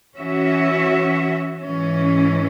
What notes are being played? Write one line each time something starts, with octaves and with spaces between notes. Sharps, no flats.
E3 C#4 F#4 E5
G#2 E3 C#4